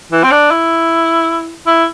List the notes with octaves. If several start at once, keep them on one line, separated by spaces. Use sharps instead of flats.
E3
C4
D4
E4
E4